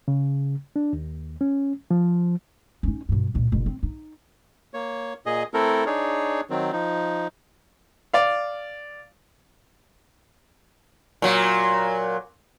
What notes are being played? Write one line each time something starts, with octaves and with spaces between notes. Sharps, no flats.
C#3
D4
D#2
C#4
F3
C#4 D#4
G2 B2
C#2 A#2
F#1 B2
C4
D#4
A#3 C#5
A#2 G#4 D#5
A3 C4 E4 A4 A#4
D4 D#4 G#4 C#5
D#3 F#3 C4
F3 D#4
D5 F5
A#2 F#3